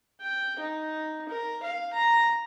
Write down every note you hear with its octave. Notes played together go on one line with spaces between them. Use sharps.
G5
D#4
A#4
F5
A#5